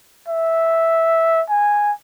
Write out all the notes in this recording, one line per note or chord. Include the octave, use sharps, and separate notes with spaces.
E5
G#5